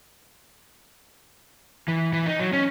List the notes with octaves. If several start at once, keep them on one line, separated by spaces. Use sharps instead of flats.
E3
E3
D#4
F#3
C#4